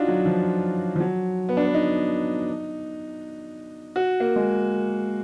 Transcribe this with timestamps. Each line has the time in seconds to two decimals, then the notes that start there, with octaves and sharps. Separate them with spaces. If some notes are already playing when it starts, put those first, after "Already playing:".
Already playing: D4 D#4 F4 F#4
0.08 F#3
0.26 F3
0.96 F3
1.00 F#3
1.49 B3
1.57 D4
1.66 B3
1.74 D#4
3.96 F#4
4.20 A#3
4.36 G#3